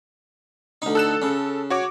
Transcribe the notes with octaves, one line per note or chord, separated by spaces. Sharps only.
D2 D#4
A4 F#6 E7
C#3
F#4 C#5 D6